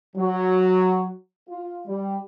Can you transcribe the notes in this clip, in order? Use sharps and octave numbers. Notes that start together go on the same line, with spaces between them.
F#3
F4
G3